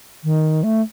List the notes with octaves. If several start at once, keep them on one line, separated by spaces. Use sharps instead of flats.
D#3
A3